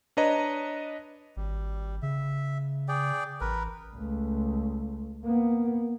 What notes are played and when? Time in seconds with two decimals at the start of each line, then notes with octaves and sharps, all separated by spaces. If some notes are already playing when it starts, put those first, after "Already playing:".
0.17 D4 B4 C#5 D#5 A#5
1.36 G#1 G3
2.02 C#3 E5
2.88 G#4 D5 G5
3.41 A1 A#4 B4
3.96 C#2 A3
5.25 A#3 B3